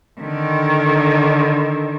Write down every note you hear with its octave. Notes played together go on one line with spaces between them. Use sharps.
D3 D#3